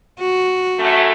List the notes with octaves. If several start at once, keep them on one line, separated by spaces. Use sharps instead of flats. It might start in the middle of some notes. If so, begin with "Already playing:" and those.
F#4
F#2 A3